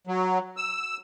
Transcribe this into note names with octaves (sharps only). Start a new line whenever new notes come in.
F#3
E6